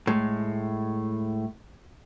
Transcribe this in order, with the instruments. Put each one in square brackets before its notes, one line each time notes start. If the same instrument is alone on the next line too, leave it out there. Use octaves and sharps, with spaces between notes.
[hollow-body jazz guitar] A2 G#3